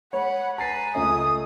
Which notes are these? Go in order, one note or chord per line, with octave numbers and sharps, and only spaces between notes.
G#3 C#5 F#5 B5
B4 G#5 A#5 A6 C7
C#2 C#3 A3 D#5 D#6